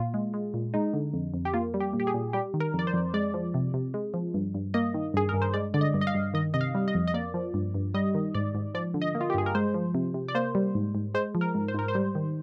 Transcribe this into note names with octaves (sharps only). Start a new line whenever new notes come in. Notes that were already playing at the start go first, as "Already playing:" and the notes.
Already playing: A#2 F4
G#3
G#3
A#2
G#3 D#4
D3
F2
F2
G4
A#3 F4
G3
G4
A#2
G4
G#4
A#2
G3 G4
D#3
A#4
F2 D5
C5
F2
G#3 D5
F3
C3
C3
G#3
F3
G2
G2
A#3 D#5
D#3
G2 G#4
G2 A#4
C5
G#3 D5
D3 D5
D#5
G2
D#5
F5
G2
D#3 D#5
C3 D#5
F5
G3
D#5
F2
D#5
A#3 D5
F3
G2
G2
G3 D#5
D#3
G#2 D5
G#2
F3 D5
D3
D#5
A#3
F4
G4
G2 G#4
A#4
G#3 C5
F3
C3
C3
D5
A#3 C5
G3
G#2
G#2
G#3 C5
F3
A#4
G#2
C5
G#2 A#4
C5
G3
D#3